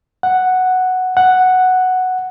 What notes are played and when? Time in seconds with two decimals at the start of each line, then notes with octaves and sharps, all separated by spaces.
0.23 F#5
1.17 F#5